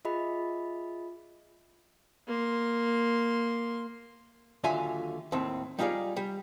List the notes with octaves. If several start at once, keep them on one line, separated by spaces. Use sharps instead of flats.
F4 G#4 D#5 E5 B5
A#3 C6
D#2 D3 F#3 F4 E5 G#5
D#2 A2 C4
G3 D#4 F4 G4 G#4 D5
G3